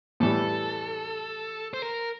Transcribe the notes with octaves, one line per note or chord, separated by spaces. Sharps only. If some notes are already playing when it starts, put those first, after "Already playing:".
A2 E3 G3 A4
C5
A#4